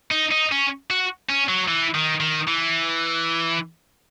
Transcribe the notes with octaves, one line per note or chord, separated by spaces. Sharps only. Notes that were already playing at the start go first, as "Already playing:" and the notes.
D#4
D#4
C#4
F#4
C#4
F#3
E3
D#3
D#3
E3